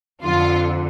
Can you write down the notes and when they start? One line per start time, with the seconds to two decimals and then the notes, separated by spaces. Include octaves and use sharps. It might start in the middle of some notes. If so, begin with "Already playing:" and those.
0.23 F2 D3 F3 F4